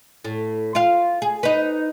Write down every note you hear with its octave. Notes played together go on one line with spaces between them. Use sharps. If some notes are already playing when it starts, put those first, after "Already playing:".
A2
F4 F5
G#4
D#4 B4